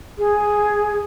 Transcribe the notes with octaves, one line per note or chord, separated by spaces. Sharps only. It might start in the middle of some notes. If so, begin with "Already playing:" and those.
G#4